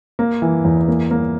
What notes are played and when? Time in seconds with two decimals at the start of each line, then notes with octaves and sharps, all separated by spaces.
0.19 A#3
0.42 E3
0.65 E2
0.88 A#3
1.11 A#3